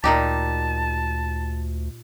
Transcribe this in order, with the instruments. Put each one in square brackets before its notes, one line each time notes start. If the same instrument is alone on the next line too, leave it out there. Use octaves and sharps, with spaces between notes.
[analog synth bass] D2 [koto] A#2 D#4 G4 [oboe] A5